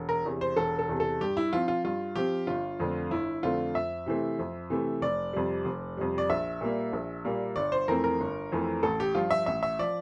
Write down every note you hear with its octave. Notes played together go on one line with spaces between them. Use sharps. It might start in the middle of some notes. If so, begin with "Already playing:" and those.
Already playing: E1
A#4
E2 C3
C5
E1 A4
A4
E2 C3
A4
G2 G4
E4
F3 C4 F4
F4
G2 F4
F3 C4 G4
G1 F4
F2 D3 A3 C4
G1 E4
F2 D3 A3 C4 F4
F2 E5
C3 E3 A3 C4
F2
C3 E3 A3 C4
F1 D5
F2 C3 G3
F1
F2 C3 G3
D5
A#1 E5
A#2 G3 A#3
A#1
A#2 G3 A#3
G1 D5
C5
F2 E3 A3 C4 A#4
A#4
G1
F2 E3 A3 C4
A1 A4
G4
G2 F3 F4
E5
A1 E5
E5
F3 D5